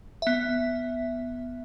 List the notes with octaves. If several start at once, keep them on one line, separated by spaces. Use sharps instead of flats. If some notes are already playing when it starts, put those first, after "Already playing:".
B3 E5